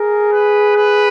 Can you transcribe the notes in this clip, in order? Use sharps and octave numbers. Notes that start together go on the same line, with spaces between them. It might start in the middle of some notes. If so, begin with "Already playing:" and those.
Already playing: G#4 A#4
B4
B4